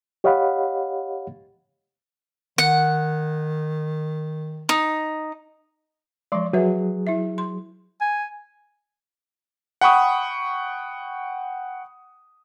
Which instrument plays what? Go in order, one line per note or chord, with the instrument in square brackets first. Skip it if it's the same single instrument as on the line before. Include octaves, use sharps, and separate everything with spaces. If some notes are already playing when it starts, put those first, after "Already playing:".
[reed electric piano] G4 C#5 D#5 F5 F#5 B5
[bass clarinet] D#3 [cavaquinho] F#5
[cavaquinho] D#4
[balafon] F3 G#3 [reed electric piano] D5 C6 D6
[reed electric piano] F#3 G#4 [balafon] F#4 B4 E5
[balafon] E4 E5
C6
[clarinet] G#5
[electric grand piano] F#5 G5 B5 C#6 D#6